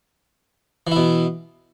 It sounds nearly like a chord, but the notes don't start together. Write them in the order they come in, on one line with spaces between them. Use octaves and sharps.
E3 E4 B2